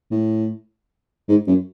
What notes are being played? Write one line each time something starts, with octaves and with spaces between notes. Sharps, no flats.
A2
G#2
F#2